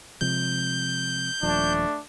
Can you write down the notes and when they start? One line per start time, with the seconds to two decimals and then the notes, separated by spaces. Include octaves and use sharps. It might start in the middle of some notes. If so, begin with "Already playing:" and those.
0.21 C3 F3 G#3 G6
1.43 D#1 F3 A3 D4